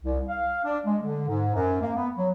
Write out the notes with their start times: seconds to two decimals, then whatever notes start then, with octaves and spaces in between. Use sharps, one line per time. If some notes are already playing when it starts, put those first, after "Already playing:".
0.03 C2
0.29 F5
0.65 D4
0.86 G#3
1.03 D3
1.28 G#2
1.54 F#2
1.81 A#3
1.96 B3
2.17 F#3